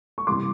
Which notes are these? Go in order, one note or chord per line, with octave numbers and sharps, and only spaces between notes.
C#6
C3 E3 G3 C6 D6